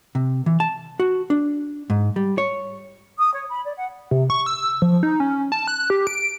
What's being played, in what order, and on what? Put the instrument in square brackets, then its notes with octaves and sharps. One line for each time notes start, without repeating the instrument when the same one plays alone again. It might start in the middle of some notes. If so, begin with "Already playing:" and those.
[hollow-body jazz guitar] C3
E3
A5
F#4
D4
G#2
G3
C#5
[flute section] D#6
C#5
B5
D5
F#5
[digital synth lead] C3
C#6
E6
F3
D#4
C#4
A5
F#6
G4
D7